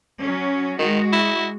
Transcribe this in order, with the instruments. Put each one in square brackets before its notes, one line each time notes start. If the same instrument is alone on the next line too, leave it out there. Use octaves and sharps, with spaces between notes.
[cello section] F#3 C#4
[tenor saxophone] D#3 [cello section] G#3 F#4
[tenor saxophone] E4